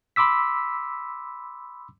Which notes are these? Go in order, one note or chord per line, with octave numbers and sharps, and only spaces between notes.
B5 C6 D6 E6 B6